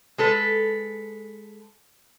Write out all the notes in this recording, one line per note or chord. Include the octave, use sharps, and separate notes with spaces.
G#3 A4 B4